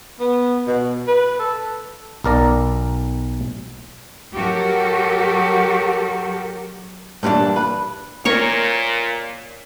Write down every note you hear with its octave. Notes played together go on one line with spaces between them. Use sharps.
B3
B2
B4
A4
B1 A#4 D5 A#5
F#3 F#4 G4 A4 A#4
G2 A#2 E3 D4
B4
A#2 A#4 C#5 C#6